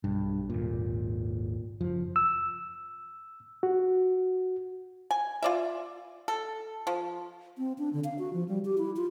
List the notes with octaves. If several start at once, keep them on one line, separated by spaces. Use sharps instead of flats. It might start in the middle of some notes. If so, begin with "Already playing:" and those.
B1 G2
G#1 D#2 A#2
F#1 F3
E6
F#4
G#5
F4 D5 E5
A4
F3
C4
D4
D3
F5
F#4
F3
G3
G4
E4
F4